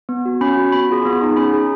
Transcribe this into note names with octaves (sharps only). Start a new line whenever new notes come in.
B3
F#4
C#4 B5
F#4
B3 B5
F4 G#4
B3
D#4 G#4
C#4 B5
G#4